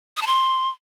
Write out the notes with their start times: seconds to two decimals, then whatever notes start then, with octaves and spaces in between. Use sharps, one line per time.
0.17 D#6
0.22 A5
0.27 C6